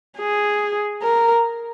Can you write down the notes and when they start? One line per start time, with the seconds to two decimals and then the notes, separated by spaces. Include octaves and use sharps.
0.18 G#4
1.03 A#4